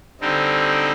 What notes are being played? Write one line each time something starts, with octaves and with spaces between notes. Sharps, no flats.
D3 G3 C4 D#4